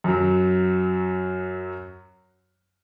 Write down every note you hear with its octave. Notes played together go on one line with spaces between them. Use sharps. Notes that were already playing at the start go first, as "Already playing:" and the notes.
F#2 F#3